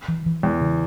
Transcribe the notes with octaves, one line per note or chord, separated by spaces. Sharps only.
E3
E3
E2 B3
C#3